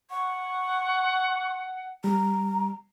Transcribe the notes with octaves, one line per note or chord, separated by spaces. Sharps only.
F#5 C#6
G3 A#5